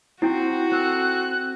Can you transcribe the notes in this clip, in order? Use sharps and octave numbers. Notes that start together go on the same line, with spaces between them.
C4 E4 F#4 G5 C6
C4 A4 E6 F#6